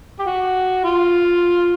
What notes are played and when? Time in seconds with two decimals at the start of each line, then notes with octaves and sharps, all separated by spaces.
0.19 G4
0.26 F#4
0.84 F4